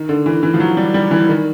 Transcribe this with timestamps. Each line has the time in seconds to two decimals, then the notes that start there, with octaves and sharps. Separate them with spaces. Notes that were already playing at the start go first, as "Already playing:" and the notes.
Already playing: D#3
0.09 D3
0.26 E3
0.43 E3
0.54 F3
0.60 F#3
0.77 G3
0.94 G3
1.11 E3
1.29 D#3